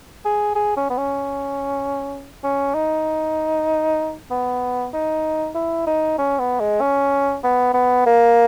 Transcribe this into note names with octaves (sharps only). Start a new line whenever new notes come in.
G#4
G#4
C#4
B3
C#4
C#4
D#4
B3
D#4
E4
D#4
C#4
B3
G#3
C#4
B3
B3
A#3